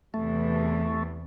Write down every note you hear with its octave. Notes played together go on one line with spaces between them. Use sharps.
E2 C3 E3 A3